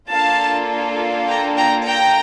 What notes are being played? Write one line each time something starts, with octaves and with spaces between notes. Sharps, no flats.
A#3 D4 F4 A4 F5 A5
G5 A#5
G5 A#5
G5 A#5